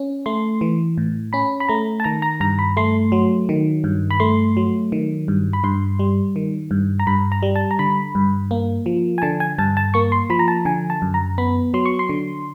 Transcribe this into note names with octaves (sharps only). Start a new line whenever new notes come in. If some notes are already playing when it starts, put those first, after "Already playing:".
Already playing: C#4
A3 C6
E3
A2
C#4 B5
B5
A3 A#5
A5
D#3 A#5
A#5
G2 A#5
B5
A3 C6
F#3
D#3
G2
B5
A3 C6
F#3
D#3
G2
B5
G2 C6
G3
D#3
G2
A#5
G2 B5
A#5
G3
A5
A#5
D3 B5
G2
A#3
F3
G#5
D3 A5
G#5
G2 A5
A5
A#3 C#6
C6
F3 B5
A#5
A5
D3 G#5
A5
F#2
A#5
B3 B5
F#3 C6
C#6
C6
D3